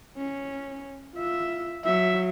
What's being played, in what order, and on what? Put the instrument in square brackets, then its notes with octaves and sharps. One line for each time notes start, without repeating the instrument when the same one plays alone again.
[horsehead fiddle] C#4
F4 E5
[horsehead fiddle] F#3 [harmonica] E5